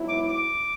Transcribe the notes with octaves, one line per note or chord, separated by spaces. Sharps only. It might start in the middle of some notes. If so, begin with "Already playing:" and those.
Already playing: G#2 F#3 B3 E4
D6
D6